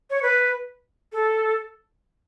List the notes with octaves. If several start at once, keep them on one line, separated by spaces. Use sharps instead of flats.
C#5
B4
A4